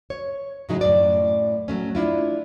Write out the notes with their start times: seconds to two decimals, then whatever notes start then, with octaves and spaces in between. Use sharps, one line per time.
0.10 C#5
0.69 A2 C#3 F#3 D#4 E4 G#4
0.81 F#2 A2 D5
1.68 F#3 A3 C#4
1.95 D4 E4 F4